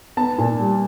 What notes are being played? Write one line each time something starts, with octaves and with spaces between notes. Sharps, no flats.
B3 A5
A#2
G3